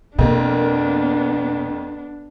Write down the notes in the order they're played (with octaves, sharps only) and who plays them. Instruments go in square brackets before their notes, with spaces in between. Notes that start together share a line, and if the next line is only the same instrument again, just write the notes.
[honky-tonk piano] F2 A#3 A#4 [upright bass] B2 [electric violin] B3 D4